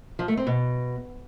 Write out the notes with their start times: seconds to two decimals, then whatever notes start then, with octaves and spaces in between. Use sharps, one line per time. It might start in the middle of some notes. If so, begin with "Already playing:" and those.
0.19 F3
0.28 A3
0.37 C4
0.47 B2